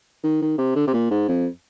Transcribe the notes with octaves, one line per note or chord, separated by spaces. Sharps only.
D#3
D#3
C3
D3
C3
A#2
G#2
F2